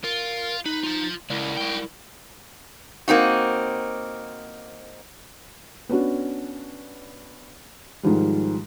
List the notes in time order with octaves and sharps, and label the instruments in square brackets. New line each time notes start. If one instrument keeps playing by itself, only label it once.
[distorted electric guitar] F4 [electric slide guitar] A#4
[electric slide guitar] D#4 [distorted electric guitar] B4
[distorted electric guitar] F4 A5
[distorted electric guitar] C#2 [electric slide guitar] E4 A#4 D5
[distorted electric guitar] F#4 G5
[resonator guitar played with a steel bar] A#3 C4 D#4 F#4
[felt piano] B3 C#4 D4 F#4
G#2 D#3 F3 G3